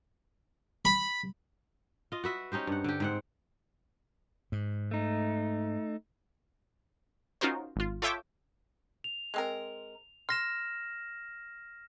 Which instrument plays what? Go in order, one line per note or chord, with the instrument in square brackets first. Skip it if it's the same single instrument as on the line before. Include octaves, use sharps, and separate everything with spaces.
[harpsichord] B5
[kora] F4 D#5
F#4 B4 E5
C#4 D#4 G4 C5
G2 F#5
D3 G4
G#2 C4 F#5
[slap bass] G#2
[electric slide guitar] A3 D#4
[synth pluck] C#4 D#4 F4 F#4 A#4 C5
G#1 F4
F4 A4 C#5 E5 G5 D6
[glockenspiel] F7
[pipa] G#3 C4 A#4
[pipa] C6 [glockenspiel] F6 A#6 E7